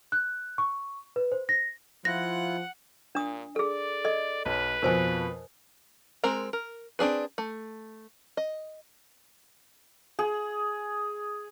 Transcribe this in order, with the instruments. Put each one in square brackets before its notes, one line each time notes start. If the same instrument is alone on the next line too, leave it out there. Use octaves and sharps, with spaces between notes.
[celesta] F#6
C#6
B4
C5
A#6
[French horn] F3 [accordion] E4 F4 F#6 [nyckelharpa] F#5 [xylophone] A#6
[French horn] A#2 [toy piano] D4 D#6
[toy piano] G#4 A4 [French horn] D5
[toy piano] A4 D#5
[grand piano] B1 [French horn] B4
[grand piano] F2 B2 F3 [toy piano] A#4 C5 G#5
[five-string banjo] G#3 C4 A#4 A#5
A#4
C4 D4 G#4 B4
A3
D#5
[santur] G#4